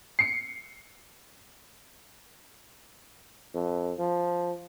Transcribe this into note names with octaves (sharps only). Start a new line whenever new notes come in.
C7 C#7
F2
F3